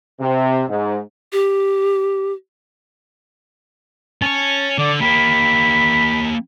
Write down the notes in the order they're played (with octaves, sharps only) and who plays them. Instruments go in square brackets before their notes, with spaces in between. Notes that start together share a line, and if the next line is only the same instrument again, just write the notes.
[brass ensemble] C3
G#2
[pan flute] G4
[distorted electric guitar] C#4 C#5 [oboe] A5
[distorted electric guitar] D3 [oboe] D5
[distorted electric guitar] A#3 G4 [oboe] B5